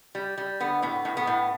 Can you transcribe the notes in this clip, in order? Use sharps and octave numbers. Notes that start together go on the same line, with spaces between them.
G3
G3
D3 B3
A2 B3
A2
B3
A2